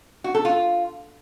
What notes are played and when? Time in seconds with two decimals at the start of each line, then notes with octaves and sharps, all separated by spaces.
0.24 F#4
0.35 A4
0.45 F4